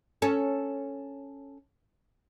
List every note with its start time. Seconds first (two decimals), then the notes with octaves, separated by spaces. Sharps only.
0.22 C#4 A4